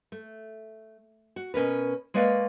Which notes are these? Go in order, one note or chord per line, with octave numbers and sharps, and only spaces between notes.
A3
F#4
B2 C#4 A#4 B4
G#3 A#3 B4 C#5 D5 F5